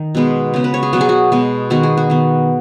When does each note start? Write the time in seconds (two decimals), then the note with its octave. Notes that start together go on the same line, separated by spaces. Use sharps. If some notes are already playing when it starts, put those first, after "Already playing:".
Already playing: D#3
0.15 B2 G#3 B3
0.54 C#3 B3
0.64 B4
0.74 C#5
0.83 G#4
0.93 B2 F#3 B3 F#4
1.01 G#4
1.09 F#4
1.32 B2 G#3 B3
1.70 D#3 G#3 B3 F#4
1.83 G#4
1.97 F#4
2.10 D#3 B3